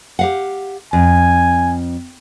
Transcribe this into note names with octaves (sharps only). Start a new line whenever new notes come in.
G4 F5 F#5
F2 G#5